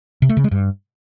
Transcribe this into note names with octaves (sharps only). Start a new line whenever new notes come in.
C3
A3
C#3
G#3
G2